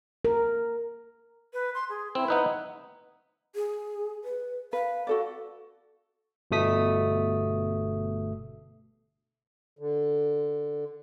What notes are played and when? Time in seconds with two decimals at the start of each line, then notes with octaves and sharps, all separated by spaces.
0.25 A#4
1.53 B4
1.74 C6
1.89 G#4
2.15 C4 E4
2.28 B3 D#4 B4
3.55 G#4
4.24 B4
4.73 B4 F5
5.07 F#4 A4 D5
6.51 G1 B2 A3 D#6 B6
9.79 D3